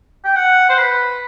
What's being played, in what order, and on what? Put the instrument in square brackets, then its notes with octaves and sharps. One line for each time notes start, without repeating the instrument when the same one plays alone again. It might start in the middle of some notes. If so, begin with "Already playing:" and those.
[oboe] G5
F#5
C5
B4